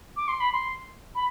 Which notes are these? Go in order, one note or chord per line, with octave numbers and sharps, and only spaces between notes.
D6
C6
B5
C6
B5